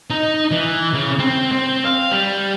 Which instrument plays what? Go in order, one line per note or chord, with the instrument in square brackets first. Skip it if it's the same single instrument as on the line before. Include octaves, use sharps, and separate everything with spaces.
[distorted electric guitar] D#4
E3
C#3
C4
C4
F5
G3